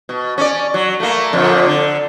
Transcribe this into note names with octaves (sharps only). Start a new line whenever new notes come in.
B2
C#4 D5
F#3
A3 A#3
F2 A#2 D3
D3